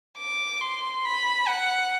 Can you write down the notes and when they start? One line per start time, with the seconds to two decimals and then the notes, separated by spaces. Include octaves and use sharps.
0.18 D6
0.61 C6
1.05 B5
1.48 F#5